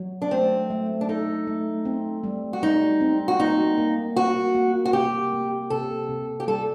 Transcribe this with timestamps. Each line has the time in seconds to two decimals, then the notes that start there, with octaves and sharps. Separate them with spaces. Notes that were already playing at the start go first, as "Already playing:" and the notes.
Already playing: F#3
0.22 D4
0.31 A3 C4
0.70 A3
1.01 D4
1.09 D#4 A4
1.47 A3
1.85 C4
2.24 G3
2.53 F#4
2.63 G3 D#4
3.01 C4
3.28 F#4
3.40 A#3 D#4
3.78 A#3
4.16 A#3 F#4
4.55 A#3
4.85 F#4
4.93 C3 G4
5.33 A#3
5.70 C3 A4
6.09 C3
6.40 G4
6.48 G3 A4